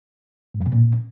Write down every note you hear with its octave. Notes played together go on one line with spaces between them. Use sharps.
G#2
F#2
B2
A#2